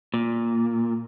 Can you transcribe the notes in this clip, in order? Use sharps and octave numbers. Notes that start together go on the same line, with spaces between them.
A#2